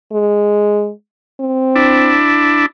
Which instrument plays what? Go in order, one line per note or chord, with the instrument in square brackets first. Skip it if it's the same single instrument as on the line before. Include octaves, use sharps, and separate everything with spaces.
[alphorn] G#3
C4
[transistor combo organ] D4 E4